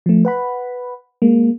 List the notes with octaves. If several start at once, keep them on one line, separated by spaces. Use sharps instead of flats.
F3 A3
B4 F#5 B5
G#3 A#3